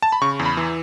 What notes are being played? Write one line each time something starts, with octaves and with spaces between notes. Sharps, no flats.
A5
B5
C#3 C#6
E2
B5
E3